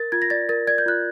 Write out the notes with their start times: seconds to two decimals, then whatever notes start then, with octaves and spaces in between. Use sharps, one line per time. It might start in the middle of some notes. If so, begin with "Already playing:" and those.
Already playing: A#4 A6
0.12 F4 G#6
0.22 A#6
0.30 D5 A6
0.49 A#4 A6
0.67 D5 G#6
0.78 G6
0.86 F4 F#6